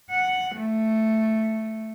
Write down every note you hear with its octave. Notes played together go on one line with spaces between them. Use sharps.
F#5
A3